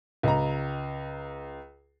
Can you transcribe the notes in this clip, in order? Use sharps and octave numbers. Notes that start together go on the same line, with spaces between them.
C#2 A#5